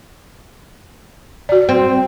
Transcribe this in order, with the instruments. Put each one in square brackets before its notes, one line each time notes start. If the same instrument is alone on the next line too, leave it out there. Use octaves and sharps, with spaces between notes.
[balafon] F#4 D5
[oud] C4